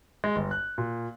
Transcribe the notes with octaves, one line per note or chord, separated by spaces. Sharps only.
G#3
G1
F#6
A#2